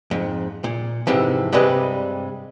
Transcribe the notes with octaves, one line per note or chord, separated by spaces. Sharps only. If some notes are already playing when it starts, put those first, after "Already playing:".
F2 G#2
A#2
F2 G#2 C3 E3
G2 C3 G3 G#3 B4